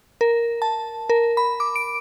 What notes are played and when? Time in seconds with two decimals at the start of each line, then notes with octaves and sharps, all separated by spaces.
0.21 A#4
0.62 A5
1.09 A#4
1.37 B5
1.60 D6
1.76 D7